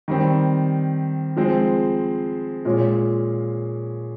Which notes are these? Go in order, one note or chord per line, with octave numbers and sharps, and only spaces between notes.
D#3 G3 C4
F3 G#3 C4
A#2 G#3 C#4 F4